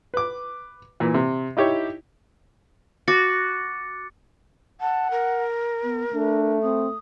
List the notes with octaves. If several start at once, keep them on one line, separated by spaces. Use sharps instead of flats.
B4 D6
A#2 E3
C3
D#4 E4 G4 C#5
F#4 D6 A6 C#7
F#5 A5
A#4
B3
A3 D4
C4 D#6